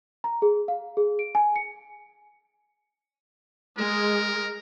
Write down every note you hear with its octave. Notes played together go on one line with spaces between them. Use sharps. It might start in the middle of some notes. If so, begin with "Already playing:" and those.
A#5
G#4
F5
G#4
D7
G#5
C#7
G#3 A#4